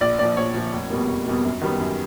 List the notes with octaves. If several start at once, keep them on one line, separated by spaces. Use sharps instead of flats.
A#1 D5
A#2 F3 D5
A#1 C#5
A#2 F3
F1
E2 B2 G3 A#3
F1
E2 B2 G3 A#3
F#2
D#3 G3 B3
F#2